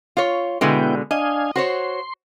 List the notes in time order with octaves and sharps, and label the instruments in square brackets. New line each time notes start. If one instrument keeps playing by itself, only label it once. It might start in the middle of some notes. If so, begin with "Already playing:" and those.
[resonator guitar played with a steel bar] F4 C#5
[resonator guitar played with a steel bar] B2 D3 G#3 [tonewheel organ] B3 E4 G5
[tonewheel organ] D4 F5 G#5 [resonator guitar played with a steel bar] D#5
[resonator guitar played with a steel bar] F#4 C5 C#5 [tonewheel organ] C6